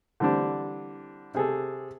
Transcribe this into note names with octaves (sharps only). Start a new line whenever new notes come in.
D3 E3 G3 C4 D4
C3 G#4 A4